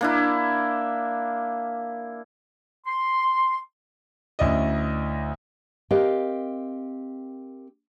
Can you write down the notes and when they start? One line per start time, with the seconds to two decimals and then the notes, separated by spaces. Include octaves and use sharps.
0.01 A#3 D4 E4
2.86 C6
4.39 D2 C#4 E4 D5 D#5
5.91 C4 G4 A#4 D#5 F5